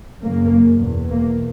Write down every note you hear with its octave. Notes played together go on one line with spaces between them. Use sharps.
F#2 C#3 A#3
E2 B2
A#3